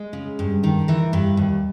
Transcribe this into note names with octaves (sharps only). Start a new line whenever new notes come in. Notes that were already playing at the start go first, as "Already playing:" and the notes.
Already playing: G#3 G#4
C#3
G2
D#3
E3 A#4
G2 B4
D#2